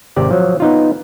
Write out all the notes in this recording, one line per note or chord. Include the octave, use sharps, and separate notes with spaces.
G#1 C3 G4 D5
F3 F#3
B3 D#4 F4